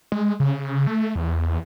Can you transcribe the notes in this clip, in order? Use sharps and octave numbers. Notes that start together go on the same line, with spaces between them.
G#3
C#3
A3
E2